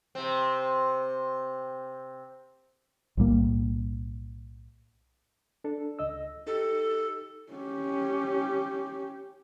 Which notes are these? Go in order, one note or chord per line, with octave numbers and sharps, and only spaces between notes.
C3 C4
B1 A2 G3 A#3
D4 A4
C#2 D#5 E6
D#4 G4 A4
C#4 G4